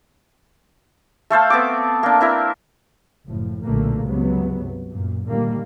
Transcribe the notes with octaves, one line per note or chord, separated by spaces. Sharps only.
A3 A4 C5 F5
B3 C4 D6
A#3 D4
C4 E4 A#4
F#1 A2 F3
B1 A#2 D3 A3 A#3
C#2 G2 C3 F#3 B3
F#2 A#2
A#2 D3 D#3 G3 A#3